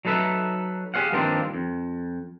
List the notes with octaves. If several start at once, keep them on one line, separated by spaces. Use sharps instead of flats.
F#3 D#4 A4 B4 E5
G4 G#4 C#5 F5 F#5
G2 D#3 F3 A#3 C4 D4
F2